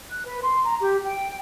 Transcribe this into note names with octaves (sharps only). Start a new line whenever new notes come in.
F#6
B4
C6
A#5
G4
G5